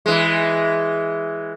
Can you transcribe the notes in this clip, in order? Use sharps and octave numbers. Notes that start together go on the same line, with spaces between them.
E3 G#3